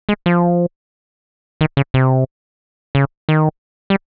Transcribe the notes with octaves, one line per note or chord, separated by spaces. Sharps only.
G#3
F3
D#3
C#3
C3
C#3
D#3
G3